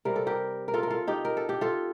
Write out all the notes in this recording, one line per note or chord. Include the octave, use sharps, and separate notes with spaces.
C3 G3 A#4
A4
G4 A#4
A#4
F4 A4
A#4
F4 A4
D#4 G4
A#4
A4
G4
F4 A4